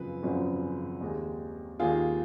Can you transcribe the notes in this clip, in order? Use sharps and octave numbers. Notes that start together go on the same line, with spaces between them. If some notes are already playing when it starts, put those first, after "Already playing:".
Already playing: G#1 F#2 C#3 F3 G#3 B4
G#1 F#2 C#3 F3 G#3
D#2 D#3 G#3
D#2 D#3 G#3 F4 G#4